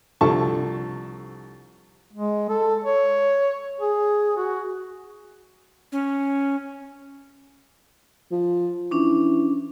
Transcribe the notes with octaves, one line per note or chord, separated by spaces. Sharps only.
C2 D3 F3 A4 A5 C#6
G#3
A4
C#5
G#4
F#4
C#4
F3
E3 C#4 D4